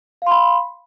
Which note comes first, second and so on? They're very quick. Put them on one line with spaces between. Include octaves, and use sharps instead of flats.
F5 C6 B5